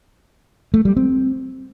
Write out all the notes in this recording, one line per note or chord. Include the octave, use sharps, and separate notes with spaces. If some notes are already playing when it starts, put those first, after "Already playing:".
A3
G3
C4